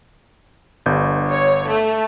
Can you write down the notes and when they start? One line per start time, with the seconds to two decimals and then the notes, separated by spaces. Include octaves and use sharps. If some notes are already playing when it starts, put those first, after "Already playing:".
0.86 G1 G2 G6
1.30 C#5
1.68 A3